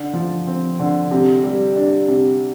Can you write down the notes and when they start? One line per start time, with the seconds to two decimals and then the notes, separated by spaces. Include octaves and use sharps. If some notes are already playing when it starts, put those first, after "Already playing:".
Already playing: D3
0.14 F3
0.47 C4
0.79 D3
1.11 C3
1.44 G3
1.76 D4
2.08 C3